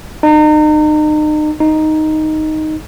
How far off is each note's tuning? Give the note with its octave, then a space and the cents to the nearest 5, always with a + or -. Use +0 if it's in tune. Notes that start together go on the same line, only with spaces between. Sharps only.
D#4 -35
D#4 +0